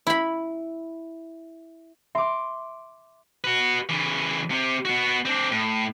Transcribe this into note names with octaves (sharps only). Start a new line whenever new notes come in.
E4 B5
E5 C6 D6
F#4 B4
C#3 E3
C3
B3 F#4
C4 D4
A2